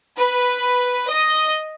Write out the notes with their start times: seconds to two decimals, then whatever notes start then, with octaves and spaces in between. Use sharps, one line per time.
0.17 B4
1.09 D#5